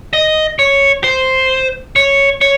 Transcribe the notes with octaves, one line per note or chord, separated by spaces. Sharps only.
D#5
C#5
C5
C#5
C#5